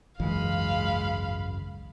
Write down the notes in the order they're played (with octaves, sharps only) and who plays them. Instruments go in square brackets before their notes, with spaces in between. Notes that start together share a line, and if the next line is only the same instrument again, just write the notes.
[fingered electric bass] G#1 C#2 F#2 [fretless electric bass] E3 [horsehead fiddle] G#3 B5 [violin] F5